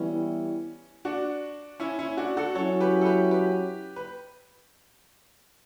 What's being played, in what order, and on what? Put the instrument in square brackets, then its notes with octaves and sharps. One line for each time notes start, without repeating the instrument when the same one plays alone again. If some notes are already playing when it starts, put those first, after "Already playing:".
Already playing: [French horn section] E3 G3 B3 E4 [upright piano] C#4
[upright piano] D4 F#4
C#4 E4
C#4 E4
D4 F#4
F#4 A4
[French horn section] F#3 C#4 E4 [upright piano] A4 C#5
[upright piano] G4 B4
A4
G4 B4
G4 B4
B4